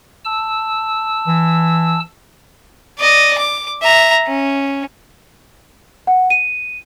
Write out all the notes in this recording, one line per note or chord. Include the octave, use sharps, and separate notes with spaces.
A5 E6
E3
D5 D#5
D6
E5 A#5
C#4
F#5
D#7